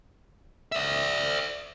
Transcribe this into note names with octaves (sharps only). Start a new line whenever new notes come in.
D5 E5